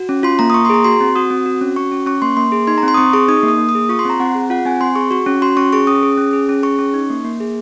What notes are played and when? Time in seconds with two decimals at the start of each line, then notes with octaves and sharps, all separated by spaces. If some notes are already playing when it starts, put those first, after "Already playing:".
Already playing: F#4
0.09 C#4
0.23 F4 C6
0.39 A#3 A#5
0.50 D#6
0.54 A#3 C#6
0.65 C6
0.70 G#4 A#5
0.84 F#4 C6
1.01 C4
1.15 F#4 D#6
1.30 C4
1.46 F#4
1.61 C#4
1.76 F#4 C#6
1.91 C#4
2.06 C#4 C#6
2.22 A#3 C6
2.37 A#3 C6
2.52 G#4
2.67 D#4 C6
2.78 A#5
2.83 C4
2.88 C6
2.94 D#6
2.97 C4 C#6
3.13 G#4 C#6
3.28 D#4 D#6
3.43 A#3
3.48 D#6
3.59 A#3
3.69 D#6
3.75 G#4
3.89 F4 C#6
3.99 C6
4.05 C4 A#5
4.20 C4 F#5
4.35 G#4
4.50 F4 F#5
4.65 C4 G#5
4.81 C4 C6
4.96 G#4 C#6
5.11 F#4 C#6
5.26 C#4
5.42 F#4 C6
5.57 C#4 C#6
5.73 G#4 C#6
5.87 C#4 D#6
6.03 G#4
6.18 C#4
6.33 G#4
6.49 C#4
6.63 G#4 C#6
6.79 C#4
6.94 D#4
7.10 A#3
7.25 A#3
7.40 G#4